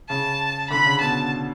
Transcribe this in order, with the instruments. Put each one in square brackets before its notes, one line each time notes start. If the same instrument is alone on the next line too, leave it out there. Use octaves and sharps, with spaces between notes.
[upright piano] C#3 [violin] A5
[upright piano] D3 [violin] B5
[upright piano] C#3
[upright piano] B2 [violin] A5